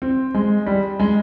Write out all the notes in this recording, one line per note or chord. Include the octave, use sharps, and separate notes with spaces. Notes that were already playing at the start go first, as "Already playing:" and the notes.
C4
G#3
G3
G#3